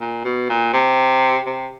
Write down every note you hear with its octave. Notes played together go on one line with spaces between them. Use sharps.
A#2
B2
A#2
C3
C3